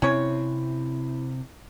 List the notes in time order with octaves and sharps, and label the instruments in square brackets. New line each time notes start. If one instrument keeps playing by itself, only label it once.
[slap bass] C3 C4 [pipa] C#4 C#5 [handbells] E4